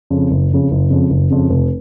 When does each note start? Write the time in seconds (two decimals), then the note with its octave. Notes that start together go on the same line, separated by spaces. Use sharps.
0.10 F2 C#3
0.31 F#1
0.51 F2 C#3
0.71 F#1
0.90 F2 C#3
1.10 F#1
1.30 F2 C#3
1.50 F1